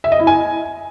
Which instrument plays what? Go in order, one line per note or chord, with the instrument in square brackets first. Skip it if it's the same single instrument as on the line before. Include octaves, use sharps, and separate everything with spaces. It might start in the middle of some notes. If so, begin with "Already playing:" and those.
[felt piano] E5
D#5
E4
G#5